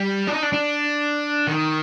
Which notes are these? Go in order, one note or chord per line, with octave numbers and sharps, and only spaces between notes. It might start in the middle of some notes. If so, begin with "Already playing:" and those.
Already playing: G3
D4
D#4
D4
D4
D#3